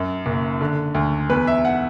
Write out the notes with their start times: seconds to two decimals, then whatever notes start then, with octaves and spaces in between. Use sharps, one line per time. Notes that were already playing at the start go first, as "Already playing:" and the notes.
Already playing: F#2
0.26 F#1
0.61 D3
0.94 D2
1.30 E2 B4
1.47 E5
1.65 F#5